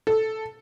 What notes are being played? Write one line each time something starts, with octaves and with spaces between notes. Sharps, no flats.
A4